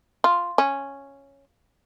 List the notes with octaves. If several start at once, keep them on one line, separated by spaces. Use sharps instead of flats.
F4
C#4